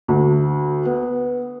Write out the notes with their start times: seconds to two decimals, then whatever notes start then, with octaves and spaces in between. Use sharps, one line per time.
0.08 D2
0.85 B3